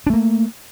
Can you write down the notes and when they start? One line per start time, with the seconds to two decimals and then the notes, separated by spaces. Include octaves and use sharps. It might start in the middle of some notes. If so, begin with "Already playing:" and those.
0.07 D4
0.10 A3
0.13 A#3